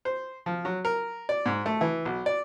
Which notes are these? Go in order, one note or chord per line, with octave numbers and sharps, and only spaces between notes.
C5
F3
F#3
A#4
D5
G#2
A3
E3
B1
D5